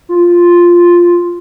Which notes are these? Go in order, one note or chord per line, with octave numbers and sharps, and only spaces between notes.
F4